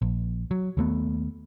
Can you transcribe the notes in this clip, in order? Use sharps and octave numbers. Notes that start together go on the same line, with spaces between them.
A#1
F#3
D#2 A3 B3